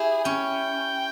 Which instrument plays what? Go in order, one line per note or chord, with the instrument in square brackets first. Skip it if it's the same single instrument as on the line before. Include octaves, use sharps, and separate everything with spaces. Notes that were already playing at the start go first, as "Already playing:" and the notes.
Already playing: [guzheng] E4 G4 [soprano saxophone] G#4
[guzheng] C#4 [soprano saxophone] G5